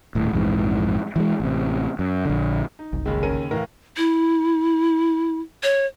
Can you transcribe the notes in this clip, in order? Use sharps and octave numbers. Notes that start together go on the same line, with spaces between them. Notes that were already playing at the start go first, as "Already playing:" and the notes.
D#1 A2
A#1 F2 G#2 E3
E3 G3 G#3
A1 C3
F#2
A#1 D3
D#4
F#1 C2
D#2 C#3 G#3
C#4 A#4 D#7
A2 E3 A#4 F5
E4
C#5